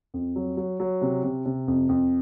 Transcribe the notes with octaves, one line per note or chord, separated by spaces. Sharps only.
F2
F#3
F#3
F#3
C3
C3
C3
F2
F2